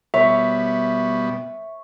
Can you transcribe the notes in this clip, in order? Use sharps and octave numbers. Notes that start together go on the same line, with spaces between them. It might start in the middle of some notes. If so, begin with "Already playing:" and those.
B2 G3 B3 C#5 E5